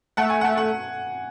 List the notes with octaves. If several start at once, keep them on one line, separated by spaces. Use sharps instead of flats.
A3 F#5
G#5
A3 F#5
F#5